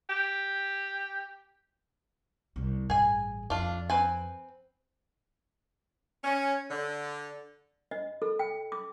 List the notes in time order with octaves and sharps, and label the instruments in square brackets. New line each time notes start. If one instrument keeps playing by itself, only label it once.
[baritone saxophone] G4
[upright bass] C2 G3
[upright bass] A1 G2 [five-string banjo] G#4 G#5
[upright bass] F2 [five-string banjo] D4 F4
[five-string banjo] C4 B4 G#5
[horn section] C#4
D3
[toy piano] D#5
A4
G5
D6